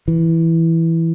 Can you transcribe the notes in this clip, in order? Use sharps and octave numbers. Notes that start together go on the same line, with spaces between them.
E3